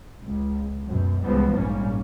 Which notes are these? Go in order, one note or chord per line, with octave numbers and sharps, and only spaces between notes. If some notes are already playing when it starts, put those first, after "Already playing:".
C#2
F#2 B2
C#2 E3 F3 G3 B3
A#1 G#2 G3 A#3 C#4